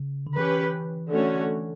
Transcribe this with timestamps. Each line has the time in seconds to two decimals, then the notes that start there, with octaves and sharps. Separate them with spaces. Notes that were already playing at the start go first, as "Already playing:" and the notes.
Already playing: C#3
0.27 D3
0.37 E3 C#4 G4 B4
1.12 D3 A3 C#4 F#4 C#5